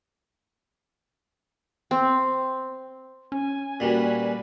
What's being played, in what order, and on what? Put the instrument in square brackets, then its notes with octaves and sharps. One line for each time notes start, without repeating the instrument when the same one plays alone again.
[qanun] C4
[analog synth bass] C#4 [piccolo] G#5
[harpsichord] A#2 G3 [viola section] A#3 F#4 B4